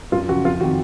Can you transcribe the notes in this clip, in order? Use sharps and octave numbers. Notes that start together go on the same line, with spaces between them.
F#2 F4
C#3 F3 F#4
F2 F4
C3 D#3 F#4